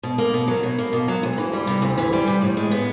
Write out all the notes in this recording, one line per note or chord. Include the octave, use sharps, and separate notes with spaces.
B2
A#3
B2
F#3
B2
A#3
B2
F#3
D2
E3
G3
C3
D2
E3
G3
C3
A2
G#3
B3